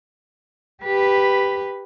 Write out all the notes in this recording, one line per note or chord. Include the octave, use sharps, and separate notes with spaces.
G4 B4